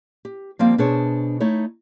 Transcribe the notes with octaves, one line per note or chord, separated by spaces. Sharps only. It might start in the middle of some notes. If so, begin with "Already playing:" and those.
G4
F3 G3 A#3 C4 F5
B2 D4 G#4 C5 C#5 A5
A3 D#4 E4 C#5